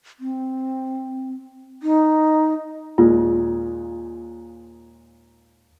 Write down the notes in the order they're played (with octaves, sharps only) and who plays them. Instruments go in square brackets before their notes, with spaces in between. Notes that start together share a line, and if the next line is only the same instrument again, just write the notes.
[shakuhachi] C4
D#4
[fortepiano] D#2 A#2 G#3 [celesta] F4